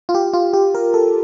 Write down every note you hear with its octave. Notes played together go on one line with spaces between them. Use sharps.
F4
G4
F4
G4
A#4
A4